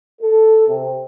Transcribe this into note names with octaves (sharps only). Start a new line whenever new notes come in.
A4
C3